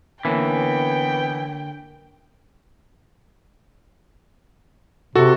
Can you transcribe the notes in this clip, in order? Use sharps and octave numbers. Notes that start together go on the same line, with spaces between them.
D3 E3 A#3 B3 C#4 G5
C3 F#4 A4